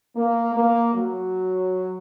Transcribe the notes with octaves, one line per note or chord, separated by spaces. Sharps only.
A#3
A#3
F#3